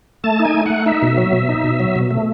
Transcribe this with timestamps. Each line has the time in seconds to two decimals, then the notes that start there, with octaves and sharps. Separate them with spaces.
0.24 A3 A5
0.39 D#4
0.45 G#5
0.54 A3
0.66 A3 F#5
0.86 D#4 E5
1.02 B2
1.17 F#3
1.32 B2
1.49 D#4
1.64 B2
1.80 F#3
1.96 B2
2.11 A3